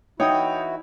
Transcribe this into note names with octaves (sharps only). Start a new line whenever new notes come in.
E3 D#4 E4 F#4 C#5 G5 D#6